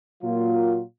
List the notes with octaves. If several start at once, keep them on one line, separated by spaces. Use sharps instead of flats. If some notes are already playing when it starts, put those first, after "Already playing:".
A#2 F#3 A#3 F4